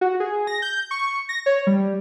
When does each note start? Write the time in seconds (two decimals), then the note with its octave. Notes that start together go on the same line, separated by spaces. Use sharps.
0.01 F#4
0.20 G#4
0.47 A#6
0.62 G6
0.91 C#6
1.29 A#6
1.46 C#5
1.67 G3